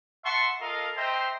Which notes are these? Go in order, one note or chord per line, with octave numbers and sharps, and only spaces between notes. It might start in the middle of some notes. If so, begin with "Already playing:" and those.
E5 F#5 A5 C6 C#6
F4 A4 A#4 D#5 F5
C5 D#5 E5 G5 A#5 C6